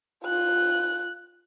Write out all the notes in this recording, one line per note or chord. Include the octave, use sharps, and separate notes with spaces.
F4 F#6